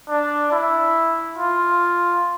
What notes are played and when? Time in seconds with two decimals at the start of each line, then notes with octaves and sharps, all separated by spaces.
0.09 D4
0.52 E4
1.38 F4